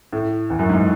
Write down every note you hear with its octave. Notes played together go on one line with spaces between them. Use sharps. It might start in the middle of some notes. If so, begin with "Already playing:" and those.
A2
E2
F#2
G#2